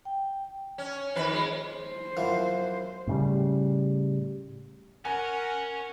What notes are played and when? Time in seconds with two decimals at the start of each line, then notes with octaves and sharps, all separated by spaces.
0.05 G5
0.78 C#4
1.15 F2 D#3 B4
1.33 G#3
1.68 C5
2.17 F#2 E3 F3
3.07 A2 C#3 G3
5.05 C#4 A#4 F#5 G#5